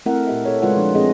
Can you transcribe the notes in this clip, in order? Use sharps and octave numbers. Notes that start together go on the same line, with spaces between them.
A3 C4 E4 A#4 E5 F#5
A#2 C4 G4 D#5 E5
A4 C#5
C#3 G#3 F4 B4 D5 F#5
F3 D4
C4 D#4 G#4 D#5